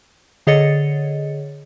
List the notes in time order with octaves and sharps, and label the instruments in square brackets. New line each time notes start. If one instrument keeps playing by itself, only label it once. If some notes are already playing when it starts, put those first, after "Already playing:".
[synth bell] D3 G#4 C#5 D#5 A6 C#7